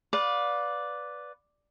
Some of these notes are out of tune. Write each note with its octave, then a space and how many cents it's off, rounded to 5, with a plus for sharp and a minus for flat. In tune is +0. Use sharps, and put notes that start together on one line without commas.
B4 +0 D5 -5 F5 +30